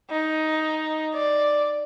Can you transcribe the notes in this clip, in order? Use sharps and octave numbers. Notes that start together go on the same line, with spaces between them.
D#4
D5